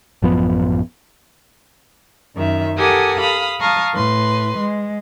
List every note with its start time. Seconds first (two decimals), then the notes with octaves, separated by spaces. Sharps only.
0.22 A1 F#2 F3 B3
2.35 F#2 D#3 E5
2.78 G4 A4 A#4 F#5 G#5 D#6
3.19 F5 B5 D#6
3.60 F5 A5 A#5 C#6 D#6 F6
3.93 A2 B4 C6
4.57 G#3